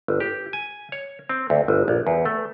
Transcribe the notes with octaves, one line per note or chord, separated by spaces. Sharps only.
G1
G4
G#5
C#5
C4
D2
G1
A#1
E2
A3